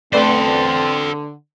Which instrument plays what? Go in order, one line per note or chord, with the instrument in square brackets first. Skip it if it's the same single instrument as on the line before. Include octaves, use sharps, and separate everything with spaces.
[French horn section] D3 [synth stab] A3 B4 D5 [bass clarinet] C4 [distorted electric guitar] A4 C5